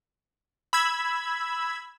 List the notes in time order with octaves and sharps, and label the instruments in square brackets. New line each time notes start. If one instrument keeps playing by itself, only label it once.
[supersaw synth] B5 E6 G#6